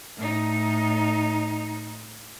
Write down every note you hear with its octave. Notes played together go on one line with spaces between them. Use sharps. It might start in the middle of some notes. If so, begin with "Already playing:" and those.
A2 D#4